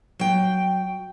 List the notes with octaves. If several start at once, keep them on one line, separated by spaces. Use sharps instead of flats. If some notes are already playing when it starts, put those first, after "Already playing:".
F#3 G5